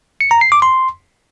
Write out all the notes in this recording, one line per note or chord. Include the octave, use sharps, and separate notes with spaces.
C#7
A#5
C7
D6
C6